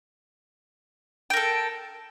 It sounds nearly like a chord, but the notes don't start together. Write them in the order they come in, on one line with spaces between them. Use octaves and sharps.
G5 A#4 A4